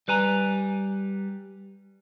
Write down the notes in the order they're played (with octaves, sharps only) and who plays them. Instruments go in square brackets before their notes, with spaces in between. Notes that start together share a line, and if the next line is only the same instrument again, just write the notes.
[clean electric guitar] G3 B4 G#5 A#5